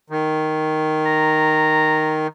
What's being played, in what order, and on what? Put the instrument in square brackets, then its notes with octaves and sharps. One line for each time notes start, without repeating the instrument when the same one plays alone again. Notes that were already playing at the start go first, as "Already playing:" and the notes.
[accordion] D#3
[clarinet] A#5